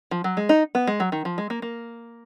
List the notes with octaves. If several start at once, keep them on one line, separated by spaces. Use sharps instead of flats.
F3
F#3
G#3
D#4
B3
G#3
F#3
D#3
F3
G#3
A#3
A#3